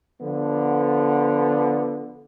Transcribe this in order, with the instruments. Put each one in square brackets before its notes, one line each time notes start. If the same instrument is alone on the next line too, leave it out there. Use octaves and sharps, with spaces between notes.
[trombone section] D3 F3 B3